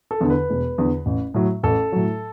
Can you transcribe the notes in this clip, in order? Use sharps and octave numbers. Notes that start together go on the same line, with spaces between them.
A4
E2 D3
B4
E1
E2 D3
A1
A2 F#3
A1 A4
A2 F#3